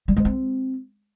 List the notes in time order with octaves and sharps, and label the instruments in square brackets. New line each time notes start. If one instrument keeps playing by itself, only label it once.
[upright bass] G3
G#3
C4